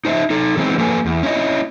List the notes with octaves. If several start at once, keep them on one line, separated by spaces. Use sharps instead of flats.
D#4 C5 D#5 E5
D#4 A4
E3 G#3 B3 C4 D#4
F3 A#3 A4 B4 G#5
E2
C#4 E4 D#5